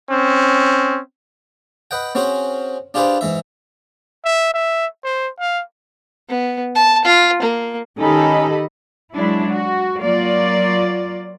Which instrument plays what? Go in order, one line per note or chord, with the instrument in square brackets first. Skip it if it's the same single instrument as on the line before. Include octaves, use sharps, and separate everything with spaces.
[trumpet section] C4 C#4
[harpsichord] B4 D#5 F#5 G5
C4 C#4 F#4 G#4 C5
D4 F4 G4 G#4 B4 C5
G#2 E3 E5
[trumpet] E5
E5
C5
F5
[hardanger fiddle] B3
A5
F4
A#3
[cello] D#3 D#5 [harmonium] C#4 D#4 [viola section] G4 A4 B5
[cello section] F#3 G#3 D4 E4
F#4
F#3 A#3 F4 D5